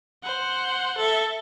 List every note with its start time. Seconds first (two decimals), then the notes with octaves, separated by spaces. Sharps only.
0.23 C5 F#5
0.97 A4 E5